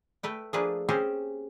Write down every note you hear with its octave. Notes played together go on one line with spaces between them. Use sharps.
A3 B4 G5
F3 A3 A#3 D4 G#4 B4
C4 C#4 G4 G#4 C5